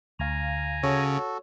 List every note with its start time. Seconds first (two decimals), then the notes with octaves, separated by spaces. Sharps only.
0.19 D2 F5 G#5 A#5
0.83 C#3 F#4 A4 C#5